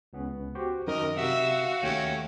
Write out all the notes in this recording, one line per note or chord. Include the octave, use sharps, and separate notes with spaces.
C#2 B3 C#4
F#4 G4 C5
F#2 D#3 A#4 D#5
C3 F#4 E5 F5
D#2 A3 C#4 G5